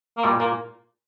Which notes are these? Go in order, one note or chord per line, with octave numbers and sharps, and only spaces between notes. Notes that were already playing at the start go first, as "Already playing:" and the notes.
A#3
A#2 G3
A#2 A#3